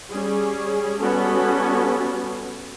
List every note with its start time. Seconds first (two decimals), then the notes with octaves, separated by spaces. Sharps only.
0.12 G3 C#4 G#4
1.00 G3 B3 C#4 F#4 A4